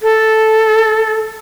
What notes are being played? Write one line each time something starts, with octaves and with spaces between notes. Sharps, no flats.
A4